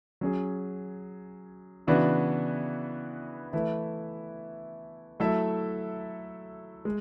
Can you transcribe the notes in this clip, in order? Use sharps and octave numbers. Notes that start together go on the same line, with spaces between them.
F#3 C#4 G#4
C#3 E3 B3 D4 F#4
E3 A3 E4 B4
F#3 A3 E4 A4 E5
G#3